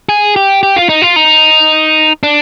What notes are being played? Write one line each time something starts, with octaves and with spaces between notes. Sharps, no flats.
G#4
G4
G4
F4
D#4
F4
D#4
D4